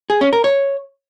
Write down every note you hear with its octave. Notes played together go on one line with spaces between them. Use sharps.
G#4
C#4
A#4
C#5